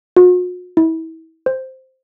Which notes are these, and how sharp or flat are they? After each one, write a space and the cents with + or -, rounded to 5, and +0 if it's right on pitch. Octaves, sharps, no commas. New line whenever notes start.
F#4 -45
E4 -30
C5 +0